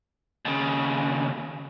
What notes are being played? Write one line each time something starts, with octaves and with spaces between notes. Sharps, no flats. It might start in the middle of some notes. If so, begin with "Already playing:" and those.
D#2 C#3